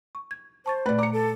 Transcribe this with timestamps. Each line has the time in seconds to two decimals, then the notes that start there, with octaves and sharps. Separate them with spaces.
0.15 C#6
0.31 G#6
0.66 C5 A5 C#6 A6
0.86 A#2 A3 B4 D5
0.99 D5 A#5 D6 C#7
1.13 A4